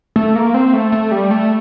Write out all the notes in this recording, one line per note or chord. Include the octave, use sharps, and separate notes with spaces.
A3
A#3
C4
A3
A3
G3
A3